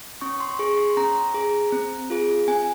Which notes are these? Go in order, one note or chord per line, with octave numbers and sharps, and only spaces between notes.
C#4 C#6
C6
G#4 C#6
C6
C#4 A#5
G#4
C4
F4 G#4
C4 G#5